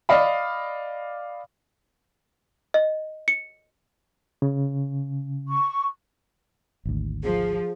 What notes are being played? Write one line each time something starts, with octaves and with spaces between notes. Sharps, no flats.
D5 D#5 F5 B5
D#5
C#7
C#3
C#6
G#1 D2
F3 G#4